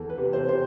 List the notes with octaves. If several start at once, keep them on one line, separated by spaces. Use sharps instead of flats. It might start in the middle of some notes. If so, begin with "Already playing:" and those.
Already playing: E2 A4
B4
C3
C5
C3 C5